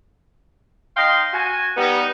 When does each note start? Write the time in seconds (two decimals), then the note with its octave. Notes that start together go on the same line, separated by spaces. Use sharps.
0.97 D#4 D#5 F5 G5 C6
1.33 F#4 G#5
1.77 G3 B3 D#4